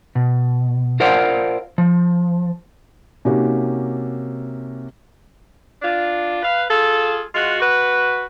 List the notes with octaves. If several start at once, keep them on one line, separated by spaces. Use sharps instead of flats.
B2
F4 A#4 C5 D5 F5 F#5
F3
C3 A#3 C#4 D#4 F#4 G4
D4 F4
B4 F5
F4 G#4 A4
G#3 F4 F#4
F#4 B4